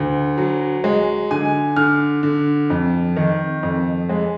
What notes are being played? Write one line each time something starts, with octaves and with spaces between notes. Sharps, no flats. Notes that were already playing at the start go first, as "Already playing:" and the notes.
Already playing: D2
F#3
G#3
D3 G#5
D3 F6
D3
F2
D#3
F2
G#3